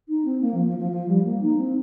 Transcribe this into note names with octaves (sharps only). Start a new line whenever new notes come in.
D#4
C4
A#3
F3
F3
F3
F3
G3
A#3
D#4
C4